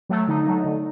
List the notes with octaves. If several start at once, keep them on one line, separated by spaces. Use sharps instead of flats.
F#3 A3
D3 D#4
F#3 A3
D3